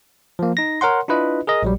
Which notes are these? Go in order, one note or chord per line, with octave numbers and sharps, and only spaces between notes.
F3 A#3
D#4 A#6
A#4 C#5 F#5 C6
D4 E4 F4 B4 D#5
G#4 A#4 D#5
A#1 F#3 G3